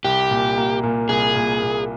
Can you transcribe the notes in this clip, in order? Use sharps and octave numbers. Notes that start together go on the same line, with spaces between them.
C2 G4
A#2
A#3
A#2
C2 G#4
A#2
A#2